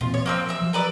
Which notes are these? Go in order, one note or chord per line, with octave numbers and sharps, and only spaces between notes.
E1 A#2 C4 F4
C#5
F3 A#3 C4 E6
E5 E6
F3 F#3
A#4 B4 D5